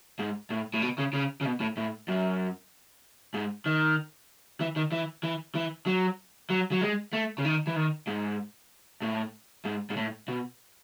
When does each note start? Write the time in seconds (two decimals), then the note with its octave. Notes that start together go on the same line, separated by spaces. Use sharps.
0.19 G#2
0.50 A2
0.74 A2
0.82 B2
0.98 C#3
1.13 C#3
1.41 C#3
1.45 B2
1.60 A2
1.77 A2
2.08 F#2
3.34 G#2
3.66 D#3
4.60 E3
4.76 D#3
4.92 E3
5.23 E3
5.55 E3
5.86 F#3
6.50 F#3
6.71 F#3
6.81 G#3
7.13 A3
7.38 C#3
7.45 D#3
7.67 E3
7.76 D#3
8.07 G#2
9.02 A2
9.65 G#2
9.90 G#2
9.97 A2
10.28 B2